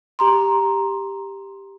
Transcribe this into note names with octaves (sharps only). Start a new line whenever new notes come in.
G4 A#5 C6